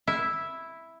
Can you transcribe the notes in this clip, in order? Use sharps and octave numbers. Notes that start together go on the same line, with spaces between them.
E4